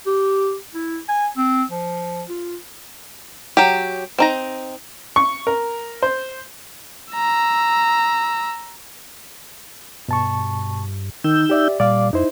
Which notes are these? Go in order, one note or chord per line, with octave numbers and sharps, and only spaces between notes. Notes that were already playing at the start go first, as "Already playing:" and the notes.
G4
E4
G#5
C4
F3
F4
F#3 G4
C4 D#4 A#5
C#6
A#4
C5
A#5 E6
G2 B2 A5 C#6
D#3 D#4 E6 G6
G4 D5 E5
A#2 G3 D5 F5 D6
F2 D#4 E4 C5